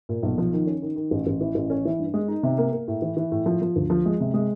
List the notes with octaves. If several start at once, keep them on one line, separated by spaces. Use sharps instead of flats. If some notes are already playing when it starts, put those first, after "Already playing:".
A#2
B1
F3
D#3
C#4
D#3
D#3
A1
A1
E3
A1
C#4
E3
G2
G#3
D#4
C3
A#3
A#3
A2
E3
E3
A2
F3
F3
D2
F3
G#3
C3
G#3